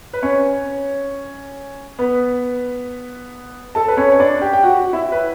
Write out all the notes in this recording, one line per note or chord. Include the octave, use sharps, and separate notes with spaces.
B4
C#4 C#5
B3 B4
A4 A5
B4
C#4 C#5
C#5
D4 D5
G4 G5
G5
F#4 F#5
E4 E5
B4